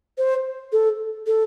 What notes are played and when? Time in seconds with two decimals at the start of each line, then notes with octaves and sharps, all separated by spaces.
0.18 C5
0.72 A4
1.27 A4